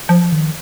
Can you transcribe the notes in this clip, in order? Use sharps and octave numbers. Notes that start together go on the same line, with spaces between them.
F3
D#3